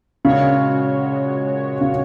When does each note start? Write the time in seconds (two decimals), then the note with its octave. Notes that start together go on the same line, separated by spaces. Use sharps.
0.25 A#2 C#3 G#3 F#4 C#5
1.81 C#3